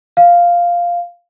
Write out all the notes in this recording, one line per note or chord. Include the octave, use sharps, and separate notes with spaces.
F5